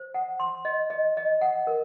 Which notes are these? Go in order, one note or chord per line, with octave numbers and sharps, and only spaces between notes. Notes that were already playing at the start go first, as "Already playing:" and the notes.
Already playing: C5
F#5
C6
D#5
D#5
D#5
F#5
A#4